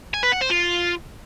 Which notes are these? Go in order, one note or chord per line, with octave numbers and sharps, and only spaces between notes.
G#5
B4
F#5
C5
F4